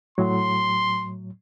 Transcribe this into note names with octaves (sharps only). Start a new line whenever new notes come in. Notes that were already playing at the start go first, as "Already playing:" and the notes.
A2 F#3 C6